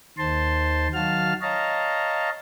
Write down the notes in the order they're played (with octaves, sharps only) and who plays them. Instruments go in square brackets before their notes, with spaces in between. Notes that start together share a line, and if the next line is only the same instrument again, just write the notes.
[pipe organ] D#2 D#3 C5 A5 C6
D#3 F#3 F#4 F5 A5 F6
C#5 D#5 F5 A5 A#5